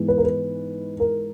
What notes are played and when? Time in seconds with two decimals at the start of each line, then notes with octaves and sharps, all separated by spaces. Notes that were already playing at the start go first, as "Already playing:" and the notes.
Already playing: G#2 E3 G#3 B3
0.08 B4
0.18 A#4
0.24 B4
1.00 A#4